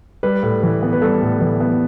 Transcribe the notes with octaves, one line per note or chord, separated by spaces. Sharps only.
G3 B4
A2
E3
B3
B4
G3 A4
A2
E3
B3